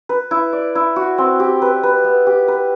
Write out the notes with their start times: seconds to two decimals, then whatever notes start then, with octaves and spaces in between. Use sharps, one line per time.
0.09 B4
0.31 E4
0.53 D5
0.75 E4
0.96 F#4
1.18 C4
1.40 G4
1.62 B4
1.83 B4
2.04 B3
2.27 G4
2.48 B4